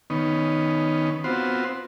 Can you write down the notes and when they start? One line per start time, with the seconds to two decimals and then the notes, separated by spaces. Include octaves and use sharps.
0.10 D#3 B3 C#4 D#4
1.24 B3 C4 F4 F#4 C5